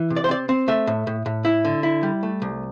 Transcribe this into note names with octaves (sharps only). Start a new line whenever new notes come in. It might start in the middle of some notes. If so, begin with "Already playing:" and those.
Already playing: E3
C3
D5
C5
C4 D5
C4
A3 E5
A2
A2
A2
E4
D3
E4
G3
A3
C2